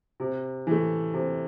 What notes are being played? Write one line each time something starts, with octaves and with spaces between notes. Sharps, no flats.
C3
E3 A3
C3